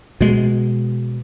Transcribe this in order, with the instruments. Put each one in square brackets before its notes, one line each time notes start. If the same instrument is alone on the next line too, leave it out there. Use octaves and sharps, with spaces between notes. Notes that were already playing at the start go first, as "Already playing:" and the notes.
[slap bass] B2 G#3